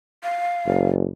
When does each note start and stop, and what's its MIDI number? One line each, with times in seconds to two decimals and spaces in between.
0.24 0.87 77
0.66 1.07 30